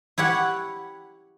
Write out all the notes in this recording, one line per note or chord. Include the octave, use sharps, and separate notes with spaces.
E4 G4 C#5 F#5